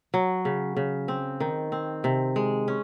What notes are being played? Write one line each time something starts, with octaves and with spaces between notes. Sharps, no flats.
F#3
C#3
C#3
C4
D#3
C4
C3
G#3
C#4